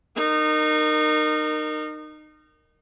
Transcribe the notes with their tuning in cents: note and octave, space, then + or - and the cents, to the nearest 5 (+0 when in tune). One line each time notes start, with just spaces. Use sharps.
D#4 -25 A#4 -10